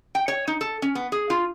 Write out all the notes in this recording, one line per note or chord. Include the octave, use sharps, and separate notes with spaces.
G5
C#5
D#4
A4
C#4
B3
G#4
F4